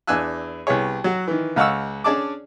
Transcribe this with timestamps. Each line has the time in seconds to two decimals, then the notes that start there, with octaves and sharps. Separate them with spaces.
0.07 E2 D4 G#5 E6 F#6
0.67 C2 B3 G#4 C#5
1.04 F#3 F#4
1.28 D#3 E3
1.56 C#2 F5 F#5 C#6 E6
2.04 C#4 D4 G#4 D5 A5 D6